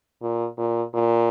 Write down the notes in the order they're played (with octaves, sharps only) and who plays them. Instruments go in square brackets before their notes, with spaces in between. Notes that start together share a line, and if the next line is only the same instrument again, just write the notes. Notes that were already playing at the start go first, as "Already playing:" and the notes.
[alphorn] A#2
A#2
A#2